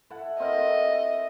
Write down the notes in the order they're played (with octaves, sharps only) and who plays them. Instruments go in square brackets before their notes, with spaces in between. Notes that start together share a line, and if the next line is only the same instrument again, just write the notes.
[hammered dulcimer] E4 A4 F#5
[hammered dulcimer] C4 E4 A#4 [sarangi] D#5